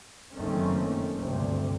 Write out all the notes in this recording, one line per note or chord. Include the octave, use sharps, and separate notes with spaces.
F#1 D#3 A3 A#3 C4 C#4
D2 G2 C3